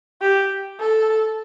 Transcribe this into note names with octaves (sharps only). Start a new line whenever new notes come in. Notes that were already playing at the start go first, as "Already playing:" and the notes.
G4
A4